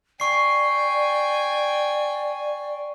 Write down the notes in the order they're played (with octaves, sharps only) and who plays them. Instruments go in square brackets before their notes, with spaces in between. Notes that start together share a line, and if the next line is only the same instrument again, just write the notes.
[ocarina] D5 [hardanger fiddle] G5 G#5 [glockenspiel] C#6 C7